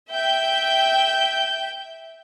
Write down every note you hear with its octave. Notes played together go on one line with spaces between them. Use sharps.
E5 G5 G6